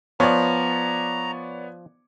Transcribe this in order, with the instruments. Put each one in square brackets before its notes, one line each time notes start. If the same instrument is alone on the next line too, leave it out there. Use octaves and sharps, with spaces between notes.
[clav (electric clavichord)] F3 [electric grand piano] B3 [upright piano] C#5 D5 [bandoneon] A#5